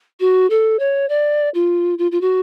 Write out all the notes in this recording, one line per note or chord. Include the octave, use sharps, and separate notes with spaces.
F#4
A4
C#5
D5
F4
F4
F4
F#4